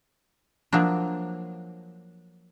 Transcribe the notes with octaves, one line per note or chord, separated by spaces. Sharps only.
F3 F#3 A#3 D4